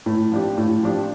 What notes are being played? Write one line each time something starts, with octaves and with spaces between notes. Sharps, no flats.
A2
F3 D4 G4
A2
F3 D4 G4